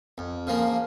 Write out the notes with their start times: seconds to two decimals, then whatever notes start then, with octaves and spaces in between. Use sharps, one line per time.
0.18 F2
0.47 C#3 F3 A#3